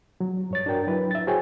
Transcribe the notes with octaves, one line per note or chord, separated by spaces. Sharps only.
F#3
G2 C#5 A6
D4 F#4 A#4 G5
F#3 E4 B4
E5 A6
F#4 G#4 C5 C#5 G5 G#5